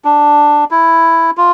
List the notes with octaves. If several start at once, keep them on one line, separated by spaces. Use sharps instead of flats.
D4
E4
F4